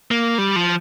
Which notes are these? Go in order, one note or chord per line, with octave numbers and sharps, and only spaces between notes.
A#3
G3
F3